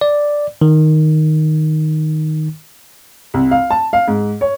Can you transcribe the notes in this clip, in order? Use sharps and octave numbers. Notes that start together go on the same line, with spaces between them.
D5
D#3
C2
F5
A5
F5
G#2
C#5